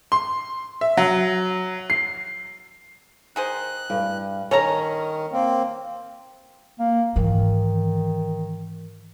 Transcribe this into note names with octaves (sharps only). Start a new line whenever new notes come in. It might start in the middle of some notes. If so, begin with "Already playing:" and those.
C6
E5
F#3
C7
D#3 G#4 C5 F#6
G2
D#3 C#4 A4 C#5 A#5
A#3 C4
A#3
G#2 D#3 E3